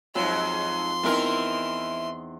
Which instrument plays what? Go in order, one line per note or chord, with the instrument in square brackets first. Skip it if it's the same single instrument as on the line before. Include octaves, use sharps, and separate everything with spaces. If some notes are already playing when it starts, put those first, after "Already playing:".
[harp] F2 [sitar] G#2 F#3 [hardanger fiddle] C6
[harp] E2 C4 D#4 [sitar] E3 E4 A#4